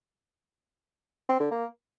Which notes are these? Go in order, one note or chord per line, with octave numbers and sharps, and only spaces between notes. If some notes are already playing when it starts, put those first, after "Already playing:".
C4
D3
A#3